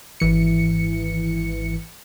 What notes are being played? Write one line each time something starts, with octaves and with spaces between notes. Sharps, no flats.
G#1 E3 C#7